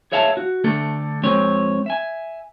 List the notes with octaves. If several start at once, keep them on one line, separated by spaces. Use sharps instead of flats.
G#4 C#5 E5 F5 G#5 A5
F#4
D3 A3 D4 A4
F2 G#3 C4 C#5
E5 G#5